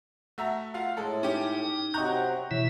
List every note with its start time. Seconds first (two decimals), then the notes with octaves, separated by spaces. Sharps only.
0.38 A3 F#4 E5 A#5
0.74 F4 F#4 F5
0.97 A2 G#3 A4
1.23 C#4 D#4 G4
1.94 C3 F#3 C4 D#5 A#5 C#6 F#6 G6
2.51 B2 E3 E4 C#5 E5